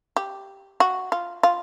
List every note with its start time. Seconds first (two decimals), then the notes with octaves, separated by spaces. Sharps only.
0.17 G4
0.80 F#4
1.12 F4
1.43 F4